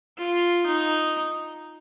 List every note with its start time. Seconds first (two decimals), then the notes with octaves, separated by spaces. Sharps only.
0.18 F4
0.66 D#4